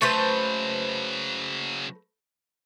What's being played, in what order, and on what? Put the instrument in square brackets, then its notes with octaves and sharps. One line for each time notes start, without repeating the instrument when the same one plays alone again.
[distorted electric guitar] C#3 F#3 [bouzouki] A3 B4 C5